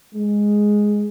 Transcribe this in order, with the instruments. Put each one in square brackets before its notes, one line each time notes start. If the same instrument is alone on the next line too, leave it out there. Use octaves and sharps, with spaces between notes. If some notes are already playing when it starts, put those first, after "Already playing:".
[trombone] G#3